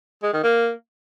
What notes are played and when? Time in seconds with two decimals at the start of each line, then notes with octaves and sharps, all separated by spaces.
0.23 G#3
0.33 D#3
0.43 A#3